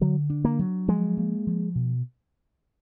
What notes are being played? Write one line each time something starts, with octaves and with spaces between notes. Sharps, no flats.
D3 F#3
D4
A#3
F#3
F3 G#3
A#3
F3
B2